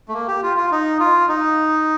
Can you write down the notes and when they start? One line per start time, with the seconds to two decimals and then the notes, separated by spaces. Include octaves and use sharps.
0.08 A3
0.14 A#3
0.28 G4
0.43 F4
0.57 F4
0.72 D#4
1.00 F4
1.29 D#4